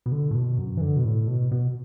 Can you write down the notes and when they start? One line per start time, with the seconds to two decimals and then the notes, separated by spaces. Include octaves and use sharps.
0.06 B2
0.12 D3
0.31 A2
0.35 B2
0.58 F#2
0.77 E3
0.81 D3
0.97 B2
1.05 A2
1.27 B2
1.51 B2